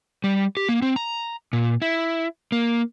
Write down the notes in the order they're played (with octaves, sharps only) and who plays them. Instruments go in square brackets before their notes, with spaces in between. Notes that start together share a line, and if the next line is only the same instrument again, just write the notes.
[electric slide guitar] G3
G4
A#3
C4
A#5
A#2
E4
A#3